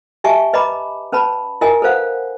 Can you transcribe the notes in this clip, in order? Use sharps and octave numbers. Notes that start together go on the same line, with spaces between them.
G4 D#5 E5 G#5 A5 C#6
B4 D#5 A#5 B5 D6
C#4 B4 A5 B5
E4 A#4 D#5 G#5
A4 B4 C5 F5 F#5